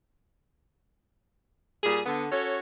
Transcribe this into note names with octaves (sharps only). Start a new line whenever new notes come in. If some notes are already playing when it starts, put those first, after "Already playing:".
A#2 G3 G#4
D3 B3
C#4 F#4 A4 C#5